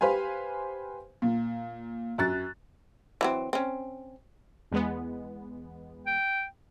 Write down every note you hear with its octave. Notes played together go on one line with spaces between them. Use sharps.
G4 B4 C5 F5 G#5
A#2
F#2 F#6 A6
E3 F#3 C4
C4 C#4
E2 G#3 B3
G5